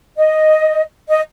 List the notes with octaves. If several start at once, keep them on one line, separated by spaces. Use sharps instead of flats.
D#5
D#5